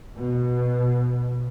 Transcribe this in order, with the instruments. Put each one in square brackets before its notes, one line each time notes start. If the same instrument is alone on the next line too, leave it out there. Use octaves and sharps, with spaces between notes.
[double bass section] B2